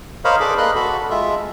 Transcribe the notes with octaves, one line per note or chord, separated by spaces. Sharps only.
A#4 C5 C#5 D#5 F5 B5
G#4 A4 B4 D5 B5 D6
A#3 D#5 B5 C6 F#6
F#4 A4 B5
G#3 F4 E5